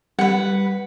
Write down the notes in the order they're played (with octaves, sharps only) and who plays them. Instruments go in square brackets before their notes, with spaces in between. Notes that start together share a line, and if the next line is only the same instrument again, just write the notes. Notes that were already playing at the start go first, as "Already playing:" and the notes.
[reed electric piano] G3 [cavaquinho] B4 F#5